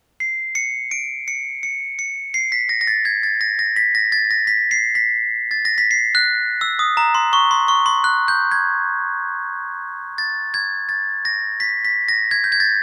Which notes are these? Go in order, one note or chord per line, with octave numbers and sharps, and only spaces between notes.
C7
C#7
D7
C#7
C#7
C#7
C7
B6
A#6
A#6
A6
G#6
A6
A#6
A#6
B6
A#6
A6
A#6
B6
C7
B6
A6
A#6
B6
C7
F#6
E6
D#6
A#5
C6
C#6
C6
C#6
C6
F#6
G6
G#6
A6
G#6
A6
A#6
B6
B6
A#6
G#6
G6
G#6
A6